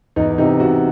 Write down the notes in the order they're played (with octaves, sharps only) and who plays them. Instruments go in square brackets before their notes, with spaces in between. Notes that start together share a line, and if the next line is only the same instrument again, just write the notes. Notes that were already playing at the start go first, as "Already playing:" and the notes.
[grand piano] E2 D#4
C3 D#4
C3 F#4